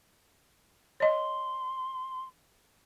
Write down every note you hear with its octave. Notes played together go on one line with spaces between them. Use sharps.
C#5 D#5 C6